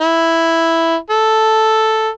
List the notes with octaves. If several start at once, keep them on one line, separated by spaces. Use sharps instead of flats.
E4
A4